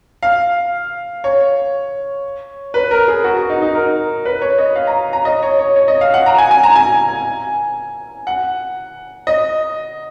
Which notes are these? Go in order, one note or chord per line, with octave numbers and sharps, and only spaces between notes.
F5
C#5
B4
A#4
G#4
F#4
F#4
D#4
D#4
A#4
B4
C#5
D#5
F5
A#5
A#5
D#5
C#5
C#5
C#5
D#5
F5
F#5
A#5
G#5
G#5
A#5
G#5
F#5
D#5